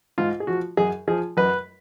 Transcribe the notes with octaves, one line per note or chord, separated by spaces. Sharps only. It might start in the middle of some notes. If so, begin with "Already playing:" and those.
G#2 F4
G#4
F3 F#4
F#2 G#4
F3 G#4
F#2 B4